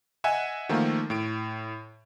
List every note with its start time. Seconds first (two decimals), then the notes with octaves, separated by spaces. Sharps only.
0.24 D#5 E5 F#5 G#5
0.69 D#3 F3 A3 A#3 F4
1.10 A2 D7